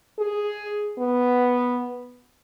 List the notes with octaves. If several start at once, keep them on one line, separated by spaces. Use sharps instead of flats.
G#4
B3